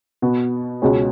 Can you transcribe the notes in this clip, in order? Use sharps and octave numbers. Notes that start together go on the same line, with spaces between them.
B2 B3 F#4
C#2 B2 G#3 C#4 F#4